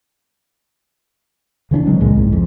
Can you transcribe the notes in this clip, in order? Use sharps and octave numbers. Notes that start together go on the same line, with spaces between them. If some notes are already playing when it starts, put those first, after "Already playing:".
C#3 E3 C#4 D4
C#3 F#3 G#3 C4
C#2 A#2 G#3
C2 G#2
F2